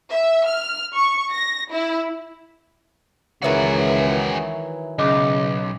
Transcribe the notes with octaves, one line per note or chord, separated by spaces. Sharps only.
E5
F6
C#6
A#6
E4
C#2 D#3 E3 F#3 F#4 G#4
B1 C#3 D#5 D6